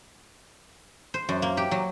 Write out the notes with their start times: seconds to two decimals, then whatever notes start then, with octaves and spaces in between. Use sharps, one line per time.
1.14 C5
1.29 F#2
1.42 A#3
1.57 G4
1.71 F#3